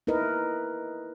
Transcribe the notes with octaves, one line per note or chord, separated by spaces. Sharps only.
D#4 E4 A#4 B4 D#5